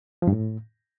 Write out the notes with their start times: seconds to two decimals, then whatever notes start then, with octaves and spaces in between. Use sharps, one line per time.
0.22 F3
0.27 G2
0.33 A2